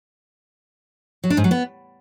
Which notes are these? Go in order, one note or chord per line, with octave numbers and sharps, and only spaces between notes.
F#3
D4
G#2
F#3
B3